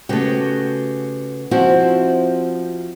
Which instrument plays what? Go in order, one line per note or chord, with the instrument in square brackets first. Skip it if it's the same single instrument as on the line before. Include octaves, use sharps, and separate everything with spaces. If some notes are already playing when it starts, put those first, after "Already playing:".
[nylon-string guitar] C#3 A3 [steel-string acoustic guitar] B3 F#4 G4
[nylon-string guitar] F3 E4 F#4 [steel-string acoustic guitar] C4